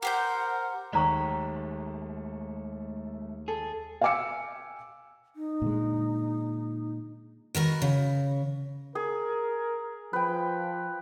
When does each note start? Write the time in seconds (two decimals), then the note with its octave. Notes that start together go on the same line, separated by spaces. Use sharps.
0.02 G4 A#4 C5 F#5 G6
0.93 D#2 G#3 A3 D5 A#5 C#6 F#6 B6
3.48 G#4 A4
4.01 F5 G5 G#5 D6 E6 C#7
5.36 D#4
5.62 A#2 D3 G#3
7.55 D#3 F#4 A#4 B4
7.82 C#3
8.95 G#4 A#4
10.13 F3 B4 G5